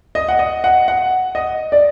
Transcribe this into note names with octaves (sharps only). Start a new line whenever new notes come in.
D#5
F#5
D#5
F#5
F#5
D#5
D5